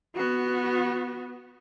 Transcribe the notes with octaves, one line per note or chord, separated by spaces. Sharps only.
B3 F#4